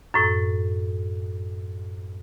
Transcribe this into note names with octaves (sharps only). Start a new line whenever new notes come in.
F#2 A2